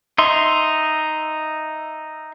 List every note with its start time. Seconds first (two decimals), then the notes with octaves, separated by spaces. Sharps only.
0.18 D#4 E5 C6